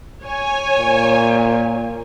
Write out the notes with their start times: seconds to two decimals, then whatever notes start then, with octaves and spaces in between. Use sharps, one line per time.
0.24 C#5 G#5
0.79 A#2